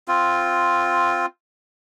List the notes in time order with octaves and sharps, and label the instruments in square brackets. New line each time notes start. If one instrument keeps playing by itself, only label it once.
[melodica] C4 F4